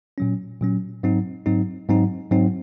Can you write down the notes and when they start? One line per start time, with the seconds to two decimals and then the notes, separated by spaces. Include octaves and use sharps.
0.18 A#2 F#3 C#4
0.61 A#2 F#3 C#4
1.03 G#2 F#3 C4 D#4
1.46 G#2 F#3 C4 D#4
1.89 G#2 F#3 C4 D#4
2.31 G#2 F#3 C4 D#4